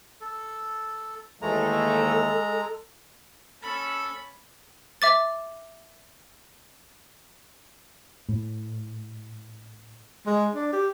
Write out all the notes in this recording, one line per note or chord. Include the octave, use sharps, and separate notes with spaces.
A4
D#2 E3 G#3 A3 A4 A#5
C#4 A4 B5
E5 D6 A6
A2
G#3
D4
G4